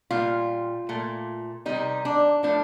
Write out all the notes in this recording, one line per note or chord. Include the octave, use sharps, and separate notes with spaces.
A#2 G3 F4
A#2 A3
C3 D#3 G3 D#4
D4
A2 F3 A3 D4